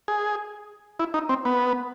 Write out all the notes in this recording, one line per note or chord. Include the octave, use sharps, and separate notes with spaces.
G#4
E4
D#4
C4
B3